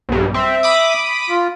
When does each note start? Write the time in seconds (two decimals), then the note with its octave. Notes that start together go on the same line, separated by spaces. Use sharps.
0.09 B1 G2
0.34 C4 E5
0.63 B5 D6 D#6
1.30 F4